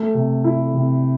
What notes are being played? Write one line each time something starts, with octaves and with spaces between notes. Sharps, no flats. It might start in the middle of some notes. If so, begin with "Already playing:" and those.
Already playing: A3
C3
E4
C3